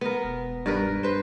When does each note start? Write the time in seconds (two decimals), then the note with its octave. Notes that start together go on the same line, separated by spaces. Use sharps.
0.01 B3 A#4
0.24 E1
0.66 G2 A#4 B4
1.03 B4 C5